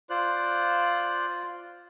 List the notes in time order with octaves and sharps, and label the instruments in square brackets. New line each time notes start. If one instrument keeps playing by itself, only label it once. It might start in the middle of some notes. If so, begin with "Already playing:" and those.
[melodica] F4 [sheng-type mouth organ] C5 D5 F#6